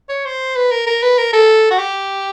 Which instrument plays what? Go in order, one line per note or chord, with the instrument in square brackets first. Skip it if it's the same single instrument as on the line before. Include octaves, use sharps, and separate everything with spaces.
[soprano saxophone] C#5
C5
B4
A#4
A#4
B4
A#4
A4
F#4
G4